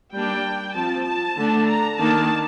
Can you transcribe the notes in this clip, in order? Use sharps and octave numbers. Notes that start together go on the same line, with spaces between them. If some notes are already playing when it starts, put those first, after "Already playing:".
G3 A#3 D4 G5
F3 C4 A5
A5
D3 A3 D4
A#5
D#3 A#3 D4 A5